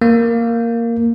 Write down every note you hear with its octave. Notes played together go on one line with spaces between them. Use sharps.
A#3